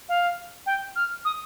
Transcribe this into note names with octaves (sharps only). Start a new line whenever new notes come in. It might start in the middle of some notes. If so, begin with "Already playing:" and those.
F5
G5
F6
D#6